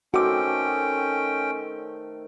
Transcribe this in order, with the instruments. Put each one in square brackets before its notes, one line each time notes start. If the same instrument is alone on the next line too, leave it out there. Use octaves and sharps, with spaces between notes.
[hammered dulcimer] D#3 A3 C4 [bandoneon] C#4 G5 [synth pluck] F#4 D6